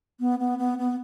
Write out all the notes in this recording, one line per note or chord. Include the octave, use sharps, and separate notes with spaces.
B3
B3
B3
B3